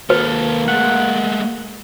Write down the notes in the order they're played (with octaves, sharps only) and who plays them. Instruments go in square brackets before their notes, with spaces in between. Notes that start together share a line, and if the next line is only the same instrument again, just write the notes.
[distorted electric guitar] D#2 A4 [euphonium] A#3 [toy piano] B4
[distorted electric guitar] G#3 A3 [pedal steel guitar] F#5